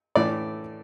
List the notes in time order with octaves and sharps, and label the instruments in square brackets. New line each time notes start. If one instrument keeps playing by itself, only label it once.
[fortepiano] A2 E3 A3 D5